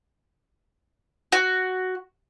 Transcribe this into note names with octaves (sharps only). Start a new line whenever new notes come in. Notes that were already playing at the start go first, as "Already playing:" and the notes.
F#4